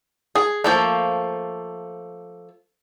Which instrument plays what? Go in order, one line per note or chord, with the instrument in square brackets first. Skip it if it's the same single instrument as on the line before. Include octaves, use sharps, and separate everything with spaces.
[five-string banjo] G#4
F3 A3 A#3